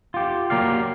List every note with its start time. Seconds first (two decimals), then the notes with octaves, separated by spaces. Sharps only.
0.14 F4 G4
0.50 F#3 G#3 A#3 G4 D5 F5